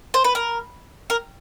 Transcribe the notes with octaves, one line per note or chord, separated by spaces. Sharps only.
C5
B4
A#4
A#4